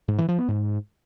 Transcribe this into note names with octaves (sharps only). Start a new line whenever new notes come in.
G#2
E3
F3
B3
G#2